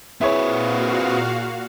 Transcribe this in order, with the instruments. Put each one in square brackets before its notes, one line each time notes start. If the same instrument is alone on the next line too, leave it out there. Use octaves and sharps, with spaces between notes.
[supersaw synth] A#2 F#4 F5 [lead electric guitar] C4 B4 [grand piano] E4 G#4 C#5